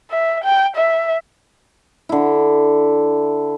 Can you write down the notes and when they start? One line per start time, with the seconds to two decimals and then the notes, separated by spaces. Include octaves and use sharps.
0.11 E5
0.44 G5
0.76 E5
2.09 D3 E4